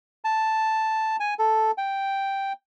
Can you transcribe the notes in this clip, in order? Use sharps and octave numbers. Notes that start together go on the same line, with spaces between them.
A5
G#5
A4
G5